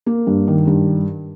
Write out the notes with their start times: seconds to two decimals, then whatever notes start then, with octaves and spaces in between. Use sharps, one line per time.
0.06 A#3
0.27 G2
0.47 D#3
0.67 G2